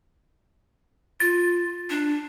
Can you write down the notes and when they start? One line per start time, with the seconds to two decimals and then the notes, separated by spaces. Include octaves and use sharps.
1.20 F4 A6
1.90 D4